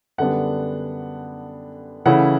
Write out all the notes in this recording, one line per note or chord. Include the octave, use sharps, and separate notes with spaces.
F#2 D3 G3 B3 D4 F#5
C#3 E3 A3 C#4 E4 F#5